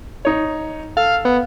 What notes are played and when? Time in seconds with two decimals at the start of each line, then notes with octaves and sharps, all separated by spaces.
0.25 D#4 C#5
0.97 A4 F5
1.25 B3